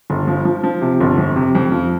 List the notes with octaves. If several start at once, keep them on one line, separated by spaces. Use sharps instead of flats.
G1
F3
F3
F3
C3
G1
F2
C3
F2
F3